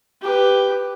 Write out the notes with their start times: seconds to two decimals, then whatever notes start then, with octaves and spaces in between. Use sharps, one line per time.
0.22 G4 B4